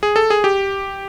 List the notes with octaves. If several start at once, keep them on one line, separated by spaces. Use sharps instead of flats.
G#4
A4
G#4
G4